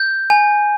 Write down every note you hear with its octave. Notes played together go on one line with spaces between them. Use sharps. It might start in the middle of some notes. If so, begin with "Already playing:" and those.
Already playing: G6
G#5